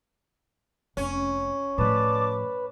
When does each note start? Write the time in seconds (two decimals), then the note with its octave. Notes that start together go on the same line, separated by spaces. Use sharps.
0.97 F1 C#4
1.78 A2 F3 B4 D5 A5 D6